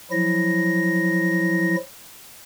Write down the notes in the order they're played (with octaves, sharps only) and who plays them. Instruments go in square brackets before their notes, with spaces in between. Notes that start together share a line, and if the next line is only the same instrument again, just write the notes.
[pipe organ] F3 F#3 E4 A#6